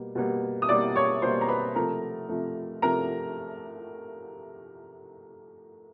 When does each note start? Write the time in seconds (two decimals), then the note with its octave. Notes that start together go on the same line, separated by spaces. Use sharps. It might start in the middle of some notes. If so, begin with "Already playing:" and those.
Already playing: B2 G3 A#3
0.15 B2 G3 A#3
0.62 D#6
0.69 B2 G3 A#3 D5 D6
0.96 C#5 C#6
1.22 B2 G3 A#3 C5 C6
1.41 A#5
1.49 B4 B5
1.75 C3 F3 A3 A#4 A#5
2.29 C3 F3 A3
2.82 C3 F3 A3 A#4 A#5